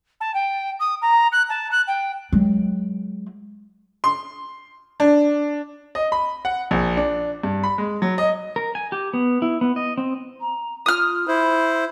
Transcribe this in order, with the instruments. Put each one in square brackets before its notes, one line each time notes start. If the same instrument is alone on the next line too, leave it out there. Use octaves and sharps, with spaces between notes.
[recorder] A5
G5
D#6
A#5
F#6
A5
F#6
G5
[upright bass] F#3 G#3
[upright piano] C6
D4
[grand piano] D#5
B5
F#5
A#1
D4
G2
B5
G#3
F#3
D#5
[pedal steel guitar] A#4
G#5
G4
B3
E4
B3
D#5
C4
[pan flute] A#5
[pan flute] F4 [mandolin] D#6 F6
[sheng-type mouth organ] E4 C5 [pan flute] B5